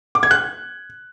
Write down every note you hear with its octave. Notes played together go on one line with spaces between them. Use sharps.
D6
G#6
F#6